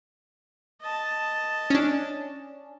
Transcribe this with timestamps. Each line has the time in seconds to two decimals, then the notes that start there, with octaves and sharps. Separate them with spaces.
0.83 D#5 A5
1.70 C#4 D4